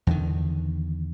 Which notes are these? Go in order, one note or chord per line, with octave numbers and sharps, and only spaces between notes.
E2 D3 D#3